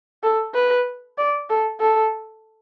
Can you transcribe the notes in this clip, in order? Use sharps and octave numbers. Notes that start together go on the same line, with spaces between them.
A4
B4
D5
A4
A4